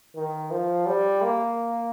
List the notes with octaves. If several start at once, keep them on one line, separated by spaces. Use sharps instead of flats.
D#3
F3
G3
A#3